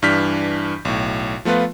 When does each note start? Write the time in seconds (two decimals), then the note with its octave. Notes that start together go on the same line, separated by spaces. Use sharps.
0.02 G2 E3 D4 F6 G6 B6
0.85 B1 A2
1.45 F3 A3 B3 F4 B4